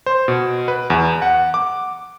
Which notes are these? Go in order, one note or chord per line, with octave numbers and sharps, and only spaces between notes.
C5
B2
B4
E2
F#5
D6